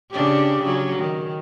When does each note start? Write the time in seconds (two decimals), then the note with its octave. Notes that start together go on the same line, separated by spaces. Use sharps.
0.11 C#3 D4 G4
0.62 C#3 F#3
0.99 D#3